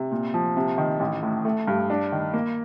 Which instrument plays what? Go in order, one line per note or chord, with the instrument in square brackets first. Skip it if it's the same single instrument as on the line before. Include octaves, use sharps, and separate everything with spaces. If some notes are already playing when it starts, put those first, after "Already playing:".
Already playing: [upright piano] C3
A#2
F3
C3
D#3
A1
A2
A3
G2
D4
D#3
A#3